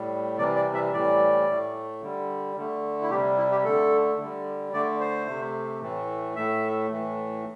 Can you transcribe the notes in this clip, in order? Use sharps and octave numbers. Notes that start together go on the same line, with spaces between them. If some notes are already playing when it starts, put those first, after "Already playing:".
Already playing: A2 G3
C3 E3 G3 D5
D5
E5
A2 E3 G3 D5
A2 A3
D3 G3
D3 A3
E4
C3 G3 G4
E4
G4
D3 A3 A4
D3 G3
D3 A3 D5
C5
C3 A3
A2 E3 A3
A2 A3 E5
A2 E3 A3